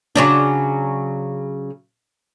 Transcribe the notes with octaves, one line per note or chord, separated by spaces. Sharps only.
C#3 F#3 D4